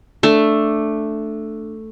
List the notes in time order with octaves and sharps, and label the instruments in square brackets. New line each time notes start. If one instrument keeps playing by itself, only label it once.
[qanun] A3 D4